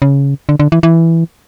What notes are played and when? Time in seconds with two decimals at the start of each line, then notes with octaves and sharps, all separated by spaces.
0.02 C#3
0.49 D3
0.60 D3
0.72 E3
0.83 E3